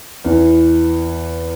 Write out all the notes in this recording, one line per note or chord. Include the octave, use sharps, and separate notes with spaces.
E2 E3